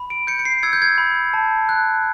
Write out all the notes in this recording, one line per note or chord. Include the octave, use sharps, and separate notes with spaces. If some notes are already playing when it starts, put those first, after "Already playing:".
Already playing: B5
D7
G6 C#7
C#7
C7
E6 G#6
G6
G#6
B5
A5
F#6